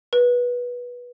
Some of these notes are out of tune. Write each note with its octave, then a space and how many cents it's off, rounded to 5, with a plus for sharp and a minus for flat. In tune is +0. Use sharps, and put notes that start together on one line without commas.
B4 -20